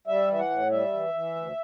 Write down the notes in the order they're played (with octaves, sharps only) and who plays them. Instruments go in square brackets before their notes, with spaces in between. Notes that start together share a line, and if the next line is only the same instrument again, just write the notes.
[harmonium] G3 E5
E3 E5
F#5
A2
G3 E5
E3
E3
D2